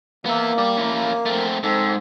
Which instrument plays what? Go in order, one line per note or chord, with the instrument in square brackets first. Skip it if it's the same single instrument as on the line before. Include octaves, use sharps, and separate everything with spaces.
[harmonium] A#3 [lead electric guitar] B3 E5
[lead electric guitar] G4 D5
C#4 E4
A3 C4
[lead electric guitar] G#2 [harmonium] C4 A4